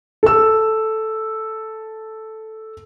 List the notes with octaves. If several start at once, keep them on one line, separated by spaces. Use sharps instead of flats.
A4 E6